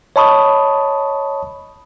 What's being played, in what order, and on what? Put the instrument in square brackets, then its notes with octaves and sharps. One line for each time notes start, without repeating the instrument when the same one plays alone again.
[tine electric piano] C#5 D#5 A5 B5 C#6 D#6